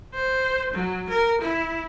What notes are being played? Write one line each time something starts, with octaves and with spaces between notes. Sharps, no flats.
C5
F#3
A#4
E4